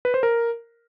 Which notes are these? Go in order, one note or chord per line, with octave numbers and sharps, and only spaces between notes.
B4
C5
A#4